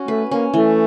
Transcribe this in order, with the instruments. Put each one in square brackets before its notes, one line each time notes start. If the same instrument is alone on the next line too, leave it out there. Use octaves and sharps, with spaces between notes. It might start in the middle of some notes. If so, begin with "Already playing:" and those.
Already playing: [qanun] C#4 F#4
[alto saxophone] A3 [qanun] B4
[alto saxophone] A#3 [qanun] C#4
[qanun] E3 [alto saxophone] A3